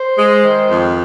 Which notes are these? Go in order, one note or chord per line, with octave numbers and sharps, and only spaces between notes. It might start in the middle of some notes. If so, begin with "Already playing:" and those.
Already playing: C5
G#3
D#3
F2